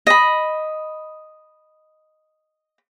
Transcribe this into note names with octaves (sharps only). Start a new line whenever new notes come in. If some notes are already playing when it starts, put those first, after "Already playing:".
D#5 B5